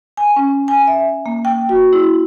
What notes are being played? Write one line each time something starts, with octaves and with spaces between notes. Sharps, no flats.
G#5
C#4
G#5
E5
A#3
G5
F#4
E4